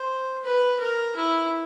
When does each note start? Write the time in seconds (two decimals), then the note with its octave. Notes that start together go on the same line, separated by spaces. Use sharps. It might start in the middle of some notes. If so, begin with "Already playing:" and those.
Already playing: C5
0.44 B4
0.80 A#4
1.15 E4